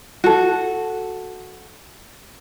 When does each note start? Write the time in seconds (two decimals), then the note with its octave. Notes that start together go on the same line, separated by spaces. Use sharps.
0.24 F#4 A4